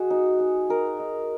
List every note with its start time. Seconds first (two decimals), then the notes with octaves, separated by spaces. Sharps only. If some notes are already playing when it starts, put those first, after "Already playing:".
Already playing: G#3 F#4 G#4
0.10 D#4
0.39 D#4
0.69 D#4 A#4
0.99 D#4